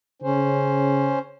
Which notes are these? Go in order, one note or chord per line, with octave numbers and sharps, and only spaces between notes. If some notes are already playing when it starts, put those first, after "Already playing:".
C#3 C#4 C5